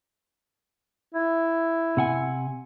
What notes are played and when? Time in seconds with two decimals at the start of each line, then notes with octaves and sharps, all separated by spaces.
1.14 E4
1.97 C3 F#5 G#5